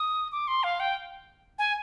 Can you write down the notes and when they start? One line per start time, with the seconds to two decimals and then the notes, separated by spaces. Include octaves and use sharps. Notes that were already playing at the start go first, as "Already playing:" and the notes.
Already playing: D#6
0.32 D6
0.48 C6
0.64 F5
0.80 G5
1.59 G#5